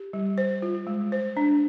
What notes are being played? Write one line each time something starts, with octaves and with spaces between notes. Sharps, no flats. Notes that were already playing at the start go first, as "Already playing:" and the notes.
Already playing: G4
G3
C5
F4
G#3
C5
D4